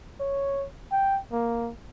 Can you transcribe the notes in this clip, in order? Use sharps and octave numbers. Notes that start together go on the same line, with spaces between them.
C#5
G5
A#3